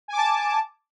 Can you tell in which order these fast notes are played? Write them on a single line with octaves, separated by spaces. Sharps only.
G#5 D6 A5